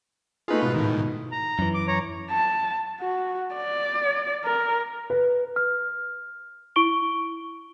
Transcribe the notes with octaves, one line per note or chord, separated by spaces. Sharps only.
A3 D#4 F4 G#4 B4
G#2 B2 B3
A2 D#3
A#5
F#2 E3
D6
C#5 A#5
A5
F#4
D5
A#4
B4
F6
E4 C#6 D7 G7